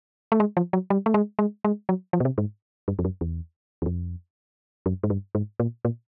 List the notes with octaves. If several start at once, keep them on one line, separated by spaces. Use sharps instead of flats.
A3
G#3
F3
F#3
G3
A3
G#3
G#3
G#3
F#3
F3
B2
C3
G#2
G2
F2
F#2
E2
E2
F2
F#2
G#2
G2
G#2
A#2
A#2